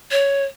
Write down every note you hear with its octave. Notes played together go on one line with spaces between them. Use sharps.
C#5